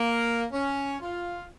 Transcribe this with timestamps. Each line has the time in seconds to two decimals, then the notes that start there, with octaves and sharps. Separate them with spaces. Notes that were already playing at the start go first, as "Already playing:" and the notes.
Already playing: A#3
0.53 C#4
1.01 F4